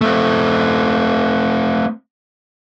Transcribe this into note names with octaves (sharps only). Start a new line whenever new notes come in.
A3 C4